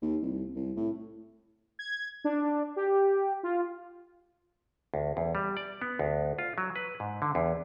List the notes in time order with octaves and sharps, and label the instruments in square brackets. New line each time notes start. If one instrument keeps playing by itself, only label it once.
[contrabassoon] D#2
C2
C2
A2
[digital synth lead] G#6
D4
G4
F4
[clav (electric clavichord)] D2
E2
G3
D5
B3
D2
F4
F#3
B4
G#2
D3
E2